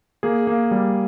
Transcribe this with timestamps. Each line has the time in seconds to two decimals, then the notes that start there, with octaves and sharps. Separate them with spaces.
0.23 A#3 G#4
0.47 A#3
0.71 G3